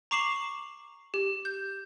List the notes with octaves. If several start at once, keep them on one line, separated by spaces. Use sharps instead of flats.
A#5 C#6 D6 C7 E7 F#7
G4
G6